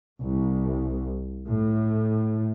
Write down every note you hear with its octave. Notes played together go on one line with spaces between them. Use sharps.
C2
A2